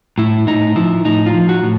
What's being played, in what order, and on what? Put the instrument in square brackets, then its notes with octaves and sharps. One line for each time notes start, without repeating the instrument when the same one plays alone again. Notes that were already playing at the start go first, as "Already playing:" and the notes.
[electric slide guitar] A2 E4
A2 D#4
F3 E4
A2 D#4
F4
F3
F#4
A2